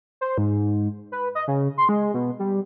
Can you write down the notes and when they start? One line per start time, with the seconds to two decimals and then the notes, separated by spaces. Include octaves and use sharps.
0.21 C5
0.38 G#2
1.12 B4
1.35 D#5
1.48 C#3
1.78 C6
1.89 G#3
2.14 B2
2.39 G3